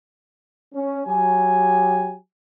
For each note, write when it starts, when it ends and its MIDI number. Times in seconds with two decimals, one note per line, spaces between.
0.73 1.01 61
1.06 2.15 54
1.06 2.15 67
1.06 2.15 80